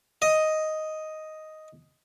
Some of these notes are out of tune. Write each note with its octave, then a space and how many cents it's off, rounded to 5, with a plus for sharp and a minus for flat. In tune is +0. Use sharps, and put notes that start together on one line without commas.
D#5 +5